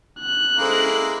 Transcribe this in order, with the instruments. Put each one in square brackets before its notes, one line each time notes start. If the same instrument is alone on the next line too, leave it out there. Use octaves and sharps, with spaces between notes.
[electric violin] F#6
[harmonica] G#3 A#3 E4 [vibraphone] C#4 A4 C5